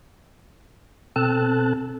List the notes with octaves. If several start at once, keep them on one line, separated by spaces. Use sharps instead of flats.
B2 C4 A4 A5 F#6